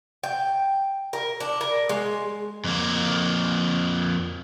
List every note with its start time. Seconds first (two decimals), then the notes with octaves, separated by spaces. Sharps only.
0.23 G5
1.13 A#4
1.40 D4
1.61 A#4
1.89 G#3
2.64 F2 A#3